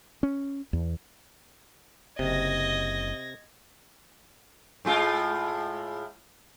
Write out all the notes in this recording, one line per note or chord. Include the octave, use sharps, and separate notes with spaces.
C#4
E2
F#1 C3 D#5 G#6 A#6
A2 G#3 F4